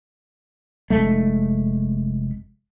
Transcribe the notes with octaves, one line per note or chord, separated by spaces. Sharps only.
F1 G#3 A3